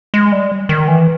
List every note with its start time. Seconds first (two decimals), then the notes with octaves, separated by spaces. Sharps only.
0.14 G#3
0.32 G3
0.69 D#3
0.88 E3